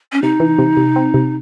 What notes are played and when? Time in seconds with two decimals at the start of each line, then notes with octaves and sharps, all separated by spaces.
0.12 C#4
0.22 C3 D#4
0.40 E3
0.59 C3
0.77 C3
0.96 C4
1.14 C3